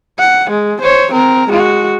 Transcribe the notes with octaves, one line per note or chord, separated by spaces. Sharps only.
F#5
G#3
C5 C#5
C4 A#4
G#3 F#4